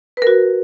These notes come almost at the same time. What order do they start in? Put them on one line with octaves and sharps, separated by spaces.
B4 A#4 F#4